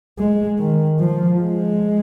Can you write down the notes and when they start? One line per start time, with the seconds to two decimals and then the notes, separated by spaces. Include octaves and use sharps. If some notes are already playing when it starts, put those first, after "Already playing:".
0.19 G#3
0.59 D#3
1.00 F3
1.40 G#3